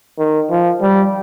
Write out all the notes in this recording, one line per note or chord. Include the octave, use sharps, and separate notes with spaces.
D#3
F3
G3